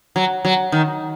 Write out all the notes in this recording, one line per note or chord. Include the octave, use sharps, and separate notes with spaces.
F#3
F#3
D#3